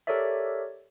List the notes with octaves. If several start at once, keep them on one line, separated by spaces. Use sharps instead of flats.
G4 A4 A#4 C#5 D5 E5